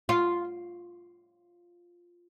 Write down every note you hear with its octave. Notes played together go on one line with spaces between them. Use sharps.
F4